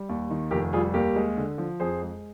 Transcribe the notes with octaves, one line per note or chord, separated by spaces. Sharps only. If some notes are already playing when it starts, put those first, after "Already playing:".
Already playing: G3
D#2
D#3
F1 G4 A#4
G3 F4 G#4
D#2 G4 A#4
G#3
D3
F3
F2 G#4 C5
G#3